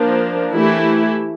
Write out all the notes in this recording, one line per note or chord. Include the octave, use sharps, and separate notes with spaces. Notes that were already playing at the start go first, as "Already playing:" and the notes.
Already playing: F3 A#3 D4
E3 A3 E4 G4